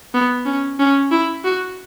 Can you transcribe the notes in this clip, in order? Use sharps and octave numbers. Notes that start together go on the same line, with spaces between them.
B3
C#4
C#4
E4
F#4